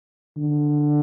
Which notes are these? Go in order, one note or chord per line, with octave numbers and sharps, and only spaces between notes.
D3